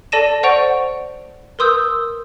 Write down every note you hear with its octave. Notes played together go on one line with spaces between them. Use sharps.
A4 D5 A5 A#6 D#7 E7
C5 D5 F#5 C#6 D7 F7
A#4 B4 C6 D#6 E6 G6